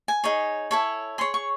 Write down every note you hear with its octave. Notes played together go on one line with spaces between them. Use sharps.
G#5
D#4 G#4 C#5
E4 A4 C#5
G#4 C#5 C6
C#6